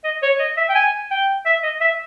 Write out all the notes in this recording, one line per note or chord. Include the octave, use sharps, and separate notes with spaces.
D#5
C#5
D#5
E5
G5
G#5
G5
E5
D#5
E5